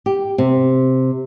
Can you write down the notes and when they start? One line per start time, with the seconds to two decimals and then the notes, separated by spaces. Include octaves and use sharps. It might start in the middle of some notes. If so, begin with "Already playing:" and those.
0.06 G4
0.38 C3